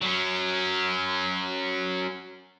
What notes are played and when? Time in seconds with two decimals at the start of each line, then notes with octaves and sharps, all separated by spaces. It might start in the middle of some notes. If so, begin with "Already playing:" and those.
0.02 F#3 C#4